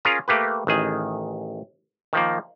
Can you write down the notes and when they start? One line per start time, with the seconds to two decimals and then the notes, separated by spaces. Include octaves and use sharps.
0.05 C#4 F4 G#4 A#4 A#5
0.28 A3 A#3 G4 B4
0.67 A1 D#3 G#4
2.13 D#3 F3 A#3